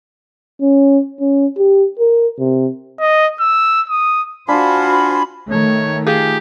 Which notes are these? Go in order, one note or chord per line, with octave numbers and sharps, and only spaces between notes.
C#4
C#4
G4
A#4
C3
D#5
E6
D#6
D4 F4 F#4 C5 F5 G#5 B5
D#3 A3 C#5
D#4 F4 G4 G#4